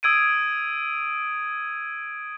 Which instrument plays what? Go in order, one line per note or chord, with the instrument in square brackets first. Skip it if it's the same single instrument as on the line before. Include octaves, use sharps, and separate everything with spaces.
[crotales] D#6 E6 G#6 D7 D#7